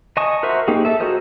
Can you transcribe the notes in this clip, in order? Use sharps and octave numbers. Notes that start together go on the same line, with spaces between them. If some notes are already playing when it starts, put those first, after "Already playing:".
D#5 G#5 A5 C#6 D#6
F#4 A#4 C5 E5 C#6
A#3 D#4 G4 G#4
A4 E5
F#4 G#4 A#4 C5 D#5